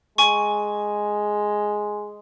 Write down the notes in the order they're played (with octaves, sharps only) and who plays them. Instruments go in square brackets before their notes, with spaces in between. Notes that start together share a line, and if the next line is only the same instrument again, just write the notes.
[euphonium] G#3 [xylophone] G#5 C#6